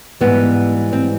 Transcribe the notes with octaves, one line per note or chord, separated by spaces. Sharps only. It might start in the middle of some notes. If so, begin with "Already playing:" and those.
G#2 E3 G3 B3
C4